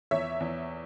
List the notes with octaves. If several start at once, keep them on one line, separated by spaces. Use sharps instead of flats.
E2 C#5 E5
E2